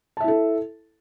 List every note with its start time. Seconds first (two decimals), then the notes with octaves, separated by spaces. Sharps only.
0.17 A5
0.21 E5
0.24 E4
0.28 A4